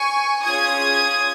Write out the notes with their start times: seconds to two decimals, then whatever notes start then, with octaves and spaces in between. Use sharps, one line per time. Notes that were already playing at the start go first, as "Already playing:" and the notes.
Already playing: G#5 C#6
0.45 C#4 F4 G#4 D#6 G#6